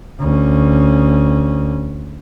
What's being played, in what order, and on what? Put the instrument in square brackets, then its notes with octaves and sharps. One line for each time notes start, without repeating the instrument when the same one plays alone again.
[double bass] D2 C#4